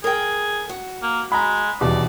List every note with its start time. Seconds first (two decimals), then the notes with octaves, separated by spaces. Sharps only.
0.04 G#4 A#4 G5
0.69 F#4
1.03 A#3
1.32 G#3 A#5 B5
1.81 D#1 E2 B2 D5